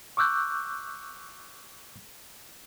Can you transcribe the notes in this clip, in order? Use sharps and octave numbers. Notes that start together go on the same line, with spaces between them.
C#6 D6 E6 F#6 G6